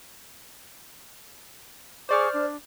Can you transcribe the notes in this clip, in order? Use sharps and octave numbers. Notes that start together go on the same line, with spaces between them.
G#4 C5 D5 C#6 D6 F6
D4